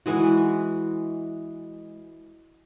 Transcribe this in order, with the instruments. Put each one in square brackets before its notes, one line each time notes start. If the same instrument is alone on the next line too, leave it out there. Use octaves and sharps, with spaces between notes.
[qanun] E3 G#3 F#4